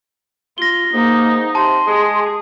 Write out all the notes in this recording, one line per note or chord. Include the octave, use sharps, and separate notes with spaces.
F4 A#6 G7
G#2 A#3 D#4
C3 A5 C6
G#3 G#4